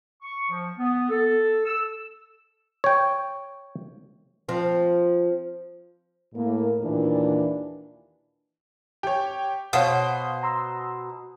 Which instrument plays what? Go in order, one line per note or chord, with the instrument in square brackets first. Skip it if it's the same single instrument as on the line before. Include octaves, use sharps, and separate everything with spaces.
[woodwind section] C#6
F3
B3
A4
E6
[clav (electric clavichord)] C#5 G5
[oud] F3 C4
[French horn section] A2 A#3
D#2 A#2 E3 D4
[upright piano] G4 C#5
[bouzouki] B2 C5 [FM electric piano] C#5 F5 F#5 [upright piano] D#6
[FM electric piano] A#5 C6 E6